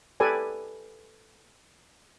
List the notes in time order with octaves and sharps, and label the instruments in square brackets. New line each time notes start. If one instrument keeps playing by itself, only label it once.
[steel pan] G4 A4 B4 D5 G#5